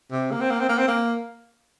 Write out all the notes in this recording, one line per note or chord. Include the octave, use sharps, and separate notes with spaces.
C3
A#3
C4
A#3
C4
A#3
C4
A#3